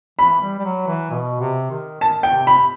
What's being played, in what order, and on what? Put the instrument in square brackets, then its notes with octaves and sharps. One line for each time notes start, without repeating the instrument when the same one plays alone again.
[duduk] E3 [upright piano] B5
[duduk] G3
G3
F#3
E3
B2
C3
D#3
[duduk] D#3 [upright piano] A5
[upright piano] G5
[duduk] C3
[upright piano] B5